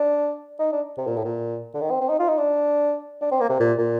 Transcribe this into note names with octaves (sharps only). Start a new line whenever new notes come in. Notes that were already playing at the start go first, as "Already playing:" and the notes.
Already playing: D4
D#4
D4
C3
A#2
A2
A#2
D3
D#3
C4
C4
D#4
F4
D#4
D4
D4
C4
A#3
C3
A#2
A#2